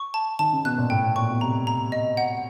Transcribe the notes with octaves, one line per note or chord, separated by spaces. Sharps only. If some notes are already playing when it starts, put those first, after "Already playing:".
Already playing: C#6
A5
D#3 A5
C#3
B2 F#6
A#2
A2 G5
A#2 C#6
B2
C3 A#5
A#5
D#5
F#5